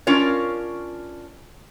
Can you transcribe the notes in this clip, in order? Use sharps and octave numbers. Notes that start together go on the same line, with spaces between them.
C#4 D4 F4 A#4 C#5